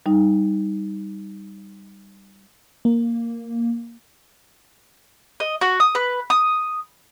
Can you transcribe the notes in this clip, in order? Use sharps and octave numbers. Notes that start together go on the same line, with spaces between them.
G3 D#4
A#3
D#5
F#4
D#6
B4
D#6